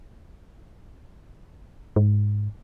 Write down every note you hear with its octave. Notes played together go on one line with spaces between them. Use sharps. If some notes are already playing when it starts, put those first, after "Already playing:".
G#2